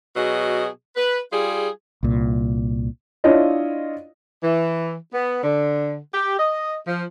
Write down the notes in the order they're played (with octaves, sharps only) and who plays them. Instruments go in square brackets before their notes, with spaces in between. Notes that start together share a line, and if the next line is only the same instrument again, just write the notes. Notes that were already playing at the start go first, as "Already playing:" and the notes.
[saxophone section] B2 F#3 G#4 D#5
B4
G3 F4 G#4
[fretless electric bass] C2 A#2
[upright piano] D4 E4 F4 C#5 D#5 F5
[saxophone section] E3
B3
D3
G4
D#5
F3